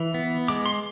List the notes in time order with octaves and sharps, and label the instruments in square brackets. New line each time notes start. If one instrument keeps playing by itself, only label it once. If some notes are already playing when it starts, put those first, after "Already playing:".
Already playing: [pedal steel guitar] E3
B3
G#3 D6
C6